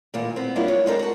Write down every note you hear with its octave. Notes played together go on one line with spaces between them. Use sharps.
E2 A#2 D#3
B3 C4
F#3 G3 A#3 D4 E4 F4
C#5
G#3 C4 D4 A4 A#4 C5
F#4 A5